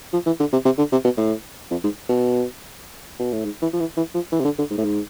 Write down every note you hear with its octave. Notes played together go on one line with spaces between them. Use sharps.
F3
E3
D3
C3
C3
D3
C3
B2
A2
F2
G#2
B2
B2
A2
G#2
E3
F3
E3
E3
F3
E3
C3
D3
D3
G#2
A2
G#2